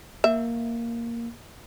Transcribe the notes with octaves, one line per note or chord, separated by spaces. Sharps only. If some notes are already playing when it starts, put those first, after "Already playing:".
A#3 E5